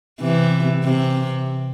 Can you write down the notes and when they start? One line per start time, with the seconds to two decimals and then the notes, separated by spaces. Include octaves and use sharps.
0.20 C3 E3
0.84 C3